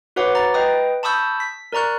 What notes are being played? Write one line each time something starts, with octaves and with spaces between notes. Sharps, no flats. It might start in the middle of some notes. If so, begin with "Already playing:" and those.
F#4 B4 C#5 F#5 D6
A#5 A6
B4 D#5 G5 D#6
A5 B5 C#6 D#6 E6 G6
B6
A#4 D5 A#5 C#6 F#6